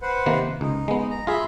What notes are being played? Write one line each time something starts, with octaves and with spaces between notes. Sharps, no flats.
B4 C5 F#5
C3 D#3 A#3
C#2 D#4
G#3 B3
A#5
F4 G#4 E5 B5 C6